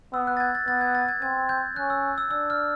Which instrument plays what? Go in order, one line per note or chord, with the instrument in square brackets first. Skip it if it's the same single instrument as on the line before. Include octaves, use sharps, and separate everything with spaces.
[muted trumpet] B3 [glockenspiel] E6
[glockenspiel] F#6
A6
G#6
A6
[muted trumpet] B3 [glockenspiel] A6
[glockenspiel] G#6
A6
G#6
[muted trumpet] C4 [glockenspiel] G#6
[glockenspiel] G6
[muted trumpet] C#4 [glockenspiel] F#6
[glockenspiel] E6
E6
[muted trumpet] D4 [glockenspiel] E6
[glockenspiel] F6